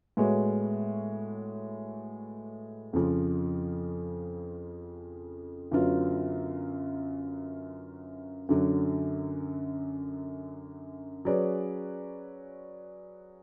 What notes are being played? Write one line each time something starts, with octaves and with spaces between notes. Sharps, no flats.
A2 G#3 B3 F#4 C#5
F2 C#3 F3
F#2 D3 F#3 B3 F4
F#2 D3 F#3
F#3 C#4 G#4 B4 D5